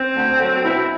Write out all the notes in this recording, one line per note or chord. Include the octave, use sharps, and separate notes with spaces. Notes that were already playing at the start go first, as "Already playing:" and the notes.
Already playing: C4
D2
D3 F#3
B2 E4